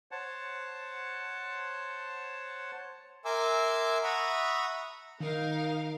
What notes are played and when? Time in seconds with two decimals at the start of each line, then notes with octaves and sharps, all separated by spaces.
0.11 C5 C#5 F#5 A5
3.25 A#4 E5 G#5 C6 D6 E6
4.04 E5 F#5 A#5 B5 C#6 D#6
5.20 D#3 D#4 A#4 F5